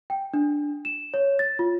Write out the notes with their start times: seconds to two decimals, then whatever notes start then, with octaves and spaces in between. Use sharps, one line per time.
0.10 G5
0.34 D4
0.85 E7
1.14 C#5
1.39 A6
1.59 F4